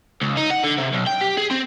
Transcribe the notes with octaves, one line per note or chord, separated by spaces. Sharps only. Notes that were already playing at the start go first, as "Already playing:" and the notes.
C#2
D#4
F#5
D3
C3
B1
G5
G4
G#4
C4